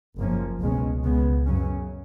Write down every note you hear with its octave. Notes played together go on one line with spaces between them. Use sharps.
F#1 F#2 F3 A#3 C#4
C#2 B2 G#3 C#4
C#2 C#3 G#3 B3
F#2 C#3 F#3 C#4